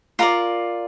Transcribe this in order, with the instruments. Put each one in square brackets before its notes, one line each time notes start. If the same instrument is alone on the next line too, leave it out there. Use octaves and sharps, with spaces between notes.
[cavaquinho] F4 A#4 D5 A#5